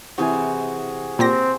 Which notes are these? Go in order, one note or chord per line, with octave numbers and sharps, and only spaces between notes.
C3 E3 C4 F#4 G#4 G#5
A#2 C4 G4 A#6